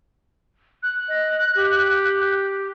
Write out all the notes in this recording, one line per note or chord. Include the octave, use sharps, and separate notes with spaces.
F#6
D#5
G4